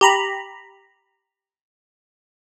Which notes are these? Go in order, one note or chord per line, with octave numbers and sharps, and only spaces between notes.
G4 A#5 B5